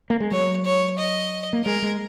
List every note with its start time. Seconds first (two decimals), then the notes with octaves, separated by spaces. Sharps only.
0.10 A#3
0.20 G#3
0.31 F#3 C#5
0.65 C#5
0.98 D#5
1.53 A#3
1.65 G#3 A#4
1.82 G#3